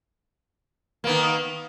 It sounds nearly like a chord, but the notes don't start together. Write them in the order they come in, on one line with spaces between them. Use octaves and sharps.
A#3 B3 D#3